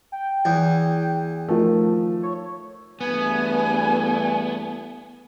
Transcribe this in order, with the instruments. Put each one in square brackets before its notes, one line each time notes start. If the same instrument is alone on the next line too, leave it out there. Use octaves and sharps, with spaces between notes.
[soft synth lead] G5
[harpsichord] E2
[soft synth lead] D#3 [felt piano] F3 A3
[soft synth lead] C#5
[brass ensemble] E2 G2 A3 [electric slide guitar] B3 [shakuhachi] G#5